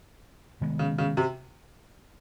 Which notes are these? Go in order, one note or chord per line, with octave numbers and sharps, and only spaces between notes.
C3 D#3 G#3 B3
C#3
C#3
C3